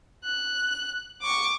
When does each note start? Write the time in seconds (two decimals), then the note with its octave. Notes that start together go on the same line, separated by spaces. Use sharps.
0.24 F#6
1.22 C#6 D6